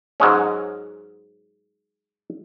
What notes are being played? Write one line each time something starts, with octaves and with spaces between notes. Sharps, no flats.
G#2 F#3 G#3 C#4